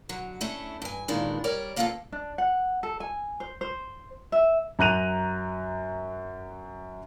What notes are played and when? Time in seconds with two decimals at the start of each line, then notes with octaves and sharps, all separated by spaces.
0.09 D3 F#3
0.41 A3 C#4 D4 E4
0.82 G2 G#5
1.08 D#2 A#2 D#3 E3 G#3 D4
1.44 G3 A#4 C#5 D5
1.76 F3 A#3 B3 F4 F#4 A4
2.12 D4
2.38 F#5
2.83 A4
3.00 G#5
3.40 C5
3.61 C5
4.32 E5
4.79 F#2 A#5 F#6 D#7 F7